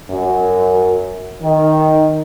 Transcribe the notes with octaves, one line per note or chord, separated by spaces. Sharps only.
F#2
D#3